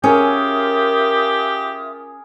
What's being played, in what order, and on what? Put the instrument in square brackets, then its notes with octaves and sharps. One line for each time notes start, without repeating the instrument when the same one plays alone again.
[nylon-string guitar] C#4 [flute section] F4 E5 D#6 [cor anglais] G4 [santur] G#4 A#4 E6